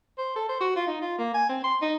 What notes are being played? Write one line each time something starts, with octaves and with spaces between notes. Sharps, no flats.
C5
A4
C5
F#4
F4
D#4
F4
A#3
G#5
C4
C6
D#4